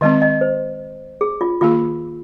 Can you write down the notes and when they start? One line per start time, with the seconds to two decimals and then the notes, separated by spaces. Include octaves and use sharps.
0.01 D#3 G#3 C4 D#5
0.22 D#5
0.41 C5
1.21 G#4
1.41 F4
1.61 D#3 A#3 F4 G#4